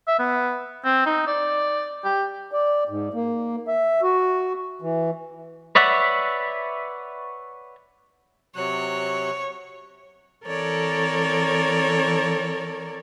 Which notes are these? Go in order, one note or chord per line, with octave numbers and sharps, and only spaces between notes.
E5
B3
C4
D#4
D5
G4
D5
G#2
A#3
E5
F#4
E3
B4 C#5 D5 E5 F#5
C3 F#3 C#5 F#6
E3 C4 A4 A#4 C#5 D5